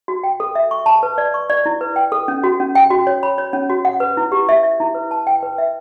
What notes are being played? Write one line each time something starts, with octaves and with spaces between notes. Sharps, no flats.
F#4
G5
A4
E5
C#6
A5
B4
D5
C#6
D5
E4
B4
G5
A4
C#4
F#4
C#4
G5
F#4
C#5
B5
C#5
C#4
F#4
F#5
B4
E4
G4
E5
E5
E4
B4
A5
G5
B4
E5